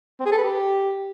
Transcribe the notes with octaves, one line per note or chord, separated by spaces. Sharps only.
C4
G#4
A4
B4
G4